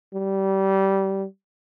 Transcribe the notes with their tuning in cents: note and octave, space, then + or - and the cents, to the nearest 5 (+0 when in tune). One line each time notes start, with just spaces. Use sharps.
G3 -20